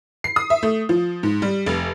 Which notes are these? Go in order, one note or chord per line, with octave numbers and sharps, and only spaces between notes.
C7
D#6
E5
A3
F3
G#2
G3
F1